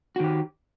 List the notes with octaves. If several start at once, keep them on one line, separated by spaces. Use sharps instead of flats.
D#3 F#4 G4